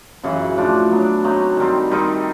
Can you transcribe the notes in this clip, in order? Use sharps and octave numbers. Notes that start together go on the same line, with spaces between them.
F#2 C#3 E3
A2 F3 A3 D4
B2 F#3 B3 D4
F#3 A3 C4 D#4
D#3 G3 C4
D#3 G3 C4 D#4